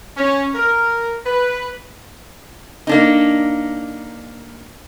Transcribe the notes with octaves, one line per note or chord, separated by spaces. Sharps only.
C#4
A#4
B4
A#3 D4 D#4